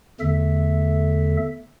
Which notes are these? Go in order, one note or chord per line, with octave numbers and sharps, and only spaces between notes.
E2 D3 A3 A4 E5